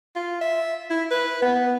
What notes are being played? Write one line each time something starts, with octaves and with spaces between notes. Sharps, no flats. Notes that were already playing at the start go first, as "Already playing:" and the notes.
F4
E5
E4
B4
B3